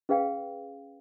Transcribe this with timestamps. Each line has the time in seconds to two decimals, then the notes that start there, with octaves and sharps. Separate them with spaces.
0.09 C#4 G#4 B4 F5 G5